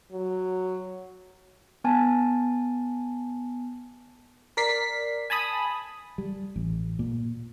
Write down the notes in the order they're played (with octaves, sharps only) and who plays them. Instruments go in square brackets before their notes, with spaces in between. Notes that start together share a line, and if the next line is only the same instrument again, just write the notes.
[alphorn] F#3
[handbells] B3 G#5 A5
[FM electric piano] A#4 D5 B6 C7
G#5 A5 B5 D#6
[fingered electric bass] G3
A1
A#2